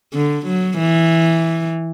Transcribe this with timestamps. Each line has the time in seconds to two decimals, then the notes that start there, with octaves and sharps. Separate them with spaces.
0.14 D3
0.46 F#3
0.79 E3